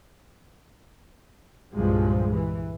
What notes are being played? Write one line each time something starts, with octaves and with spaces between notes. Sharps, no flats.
C2 G2 A#2 F3 G#3
E3